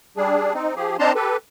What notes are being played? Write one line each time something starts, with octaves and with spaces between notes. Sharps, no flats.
G3 D4 G#4
C4 D#4
F3 G4 G#4
C4 D4 D#4 A5 A#5 C6
G4 A4 B4